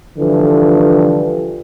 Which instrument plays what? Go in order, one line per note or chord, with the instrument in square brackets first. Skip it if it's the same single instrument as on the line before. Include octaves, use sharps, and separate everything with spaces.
[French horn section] D3 E3 F3 G3